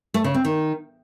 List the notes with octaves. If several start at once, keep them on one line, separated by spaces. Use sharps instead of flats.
A3
C#3
C4
D#3